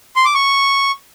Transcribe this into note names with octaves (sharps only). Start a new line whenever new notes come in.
C6
D6
C#6